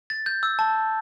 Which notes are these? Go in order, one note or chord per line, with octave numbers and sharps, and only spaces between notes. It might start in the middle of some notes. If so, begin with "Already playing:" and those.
A6
G6
E6
A5